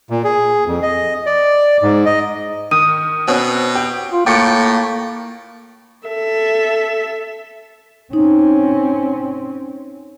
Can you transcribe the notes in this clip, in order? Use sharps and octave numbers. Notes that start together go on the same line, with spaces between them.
A#2
G#4
F2
D#5
D5
G#2
D#5
D#3 D#6 D#7
B2 C4 C#4
G4
F4
A2 A#3 G5 C#6 D6 A6 C#7
A4 E5
C4 C#4 D#4